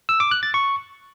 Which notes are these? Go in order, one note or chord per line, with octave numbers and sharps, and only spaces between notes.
E6
D6
F#6
A6
C#6